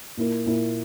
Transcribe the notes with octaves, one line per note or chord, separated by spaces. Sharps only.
A#2 A#3 E4 A#4
A#2 A#3 E4 A#4